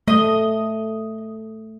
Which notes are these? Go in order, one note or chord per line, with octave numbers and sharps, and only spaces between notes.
A3 D#5